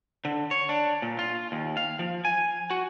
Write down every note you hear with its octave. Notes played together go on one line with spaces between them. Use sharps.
D3
C#5
D4
A#2
F4
D#2
F5
F3
G#5
F#4